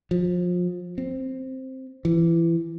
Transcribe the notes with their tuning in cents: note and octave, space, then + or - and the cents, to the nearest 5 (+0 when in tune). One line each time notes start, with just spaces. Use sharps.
F3 +30
C4 +5
E3 +25